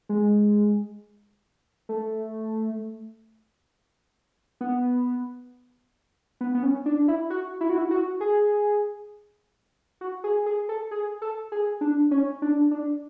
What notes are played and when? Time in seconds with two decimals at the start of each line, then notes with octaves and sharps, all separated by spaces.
0.09 G#3
1.89 A3
4.61 B3
6.41 B3
6.55 B3
6.63 C#4
6.86 D4
7.08 E4
7.30 F#4
7.61 E4
7.69 F#4
7.78 E4
7.91 F#4
8.21 G#4
10.01 F#4
10.24 G#4
10.46 G#4
10.69 A4
10.91 G#4
11.22 A4
11.52 G#4
11.81 D4
12.11 C#4
12.42 D4
12.71 D4